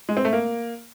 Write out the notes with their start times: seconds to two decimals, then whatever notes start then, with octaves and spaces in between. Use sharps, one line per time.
0.09 G#3
0.17 C4
0.25 A3
0.33 A#3